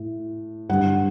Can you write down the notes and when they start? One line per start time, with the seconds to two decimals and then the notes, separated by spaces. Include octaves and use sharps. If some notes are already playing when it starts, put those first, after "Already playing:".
Already playing: A2
0.69 G2 D3 G3 F#5